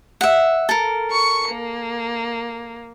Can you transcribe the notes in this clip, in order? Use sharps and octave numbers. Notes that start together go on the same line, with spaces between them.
E5 F#5
A4 A#4
C#6 C#7
A#3